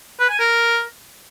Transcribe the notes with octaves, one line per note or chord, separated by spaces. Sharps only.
B4
G#5
A#4